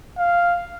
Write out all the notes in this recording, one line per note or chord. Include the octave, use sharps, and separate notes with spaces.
F5